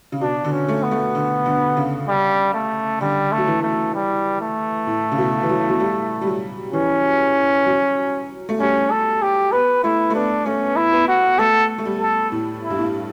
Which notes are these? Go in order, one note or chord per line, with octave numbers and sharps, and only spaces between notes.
C#3
B2 D4
D3
C#4
A3
B3
A3
D3
D3
C#3
G3
A3
D3 G3
A3
F#3
E3
A3
G3
A3
A2
C#3
B2
E3
F#3
F#3
G3
G3
F#3
E3 C#4
F#3
A3
G3 C#4
A4
G4
B3 B4
A3 E4
A3
B3 D4
A3 C#4
E4
B3
F#4
A3 A4
A3
G3
A4
A2
E4
G2
A2